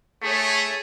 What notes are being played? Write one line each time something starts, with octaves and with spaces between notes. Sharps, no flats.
A3 G#4 C#5